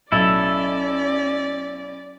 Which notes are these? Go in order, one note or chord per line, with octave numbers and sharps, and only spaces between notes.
B1 C#4 E4 A4 D5